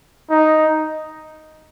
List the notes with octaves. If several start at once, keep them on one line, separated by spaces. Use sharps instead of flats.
D#4